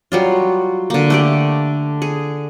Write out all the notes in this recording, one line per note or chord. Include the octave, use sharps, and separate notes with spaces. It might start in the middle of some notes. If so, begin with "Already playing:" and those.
F#3 G3 F4
D3 A#3
A3 G4 D5
G#4